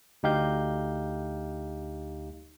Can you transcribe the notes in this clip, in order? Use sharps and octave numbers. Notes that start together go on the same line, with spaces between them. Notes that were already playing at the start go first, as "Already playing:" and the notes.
D2 D#4 G4 F5 G6